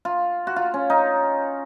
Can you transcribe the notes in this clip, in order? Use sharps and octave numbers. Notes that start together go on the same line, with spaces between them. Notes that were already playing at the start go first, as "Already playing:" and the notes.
F4
F#4
F4
C#4
D#4